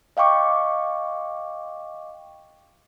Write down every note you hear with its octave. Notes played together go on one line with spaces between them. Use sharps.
D#5 F5 G5 C#6 D6